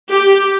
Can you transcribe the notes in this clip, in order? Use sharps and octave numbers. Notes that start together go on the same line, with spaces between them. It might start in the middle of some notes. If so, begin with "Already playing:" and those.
G4